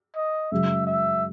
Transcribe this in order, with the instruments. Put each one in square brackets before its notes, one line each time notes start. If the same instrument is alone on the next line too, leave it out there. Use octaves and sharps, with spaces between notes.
[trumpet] D#5
[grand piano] F#2 C#3 G#3 [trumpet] E5
[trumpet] E5